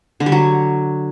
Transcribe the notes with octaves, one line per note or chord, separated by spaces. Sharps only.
D3
G3
F#3